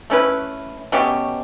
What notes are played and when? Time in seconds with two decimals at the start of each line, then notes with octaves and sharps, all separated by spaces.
0.10 A3 C#4 E4 B4
0.92 B2 A3 C#4 G4